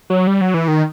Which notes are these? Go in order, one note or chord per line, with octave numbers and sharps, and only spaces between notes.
F#3
G3
F#3
E3
D#3